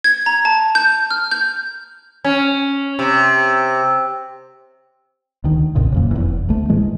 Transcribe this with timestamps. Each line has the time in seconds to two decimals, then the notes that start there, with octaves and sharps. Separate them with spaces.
0.04 G#6
0.26 A#5
0.45 A5
0.75 G6
1.11 F6
1.31 G6
2.24 C#4
2.99 C3
5.44 D2 D#3
5.75 A#1 F2 A#2 C#3
5.92 D#1 F#2 A#2
6.11 F1 E2
6.49 D2 A3
6.69 A2 E3 G#3 A3